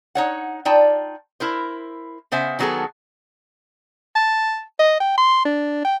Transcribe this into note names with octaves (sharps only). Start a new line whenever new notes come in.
D#4 C#5 F#5
D#4 F4 D5 G5 A5
E4 A#4 C5
C#3 B3 C5 E5 G#5
D#3 F#3 B3 D4 G#4 A4
A5
D#5
G5
C6
D4
G5